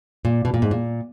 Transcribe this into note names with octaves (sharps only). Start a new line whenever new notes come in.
A#2
B2
A#2
G#2
A#2